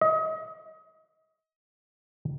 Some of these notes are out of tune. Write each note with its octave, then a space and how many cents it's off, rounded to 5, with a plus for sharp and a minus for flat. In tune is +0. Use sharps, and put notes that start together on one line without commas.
D#5 +30